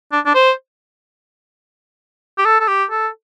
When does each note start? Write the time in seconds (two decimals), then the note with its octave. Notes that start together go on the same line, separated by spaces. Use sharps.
0.12 D4
0.26 D4
0.35 C5
2.38 G4
2.45 A4
2.60 A4
2.68 G4
2.91 A4